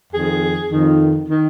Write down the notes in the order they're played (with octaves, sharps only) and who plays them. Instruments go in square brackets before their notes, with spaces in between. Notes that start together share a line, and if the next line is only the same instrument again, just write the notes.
[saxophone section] F2 D#3 G#4
F2 D#3
D#3